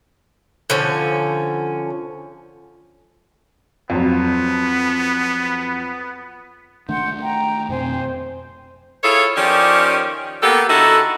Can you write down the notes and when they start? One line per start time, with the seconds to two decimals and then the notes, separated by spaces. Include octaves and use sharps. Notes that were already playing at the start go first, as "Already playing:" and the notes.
0.70 D3 F3 C#4
3.90 F2 F#3 B3
6.89 D#3 A3 D4 F#5 C6 G6
7.21 G5 A#5
7.69 F2 B2 C4 C5 G#5
9.04 E4 F4 G#4 A4 C#5
9.37 D#3 F3 C#4 G4 C#5 D5
10.43 A#3 B3 G4 A4
10.70 D3 D#4 E4 F#4 A4